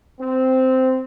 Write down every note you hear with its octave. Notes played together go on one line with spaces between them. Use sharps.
C4